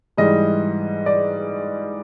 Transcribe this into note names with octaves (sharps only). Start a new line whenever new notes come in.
G#2 E3 G3 D#5
D5